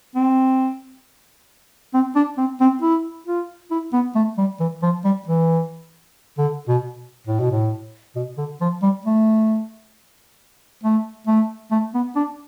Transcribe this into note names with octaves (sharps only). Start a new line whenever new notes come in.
C4
C4
D4
C4
C4
E4
F4
E4
B3
A3
G3
E3
F3
G3
E3
D3
B2
A2
B2
A2
B2
D3
F3
G3
A3
A3
A3
A3
B3
D4